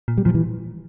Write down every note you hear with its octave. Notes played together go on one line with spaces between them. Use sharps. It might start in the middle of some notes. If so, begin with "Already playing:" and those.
A#2
G3
A#2 F3
E3